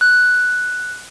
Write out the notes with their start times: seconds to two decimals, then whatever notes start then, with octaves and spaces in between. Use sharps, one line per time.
0.01 F#6